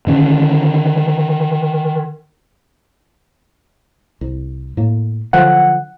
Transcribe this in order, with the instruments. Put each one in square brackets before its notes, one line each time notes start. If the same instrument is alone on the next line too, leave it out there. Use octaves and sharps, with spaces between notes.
[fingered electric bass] D3 D#3 C#4
[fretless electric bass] C2
A2 A#3
[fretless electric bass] D3 F3 F#3 [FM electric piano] F#5